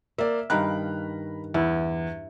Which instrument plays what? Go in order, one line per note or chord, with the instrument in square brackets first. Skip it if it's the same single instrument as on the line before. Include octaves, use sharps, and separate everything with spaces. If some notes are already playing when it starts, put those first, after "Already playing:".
[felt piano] A#3 D5 [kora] E5
[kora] G2 D#3 F5 [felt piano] A#5 B5 F#6
[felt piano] E2 [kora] E4